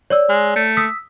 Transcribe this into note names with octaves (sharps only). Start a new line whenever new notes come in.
C#5 D5 E6
G#3
A3
D#6 E6 B6